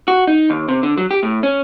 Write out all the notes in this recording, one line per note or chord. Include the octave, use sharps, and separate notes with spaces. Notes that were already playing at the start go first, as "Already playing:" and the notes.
F#4
D#4
D#2
C3
D3
F#3
G4
A2
C#4